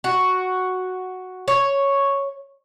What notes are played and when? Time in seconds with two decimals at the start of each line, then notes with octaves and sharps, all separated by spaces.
0.04 F#4
1.48 C#5